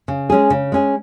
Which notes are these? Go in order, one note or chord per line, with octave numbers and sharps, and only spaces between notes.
C#3
G#3 C#4 G#4
C#3
G#3 C#4 G#4